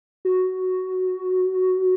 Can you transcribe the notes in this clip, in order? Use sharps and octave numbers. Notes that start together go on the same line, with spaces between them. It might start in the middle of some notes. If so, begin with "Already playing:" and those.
F#4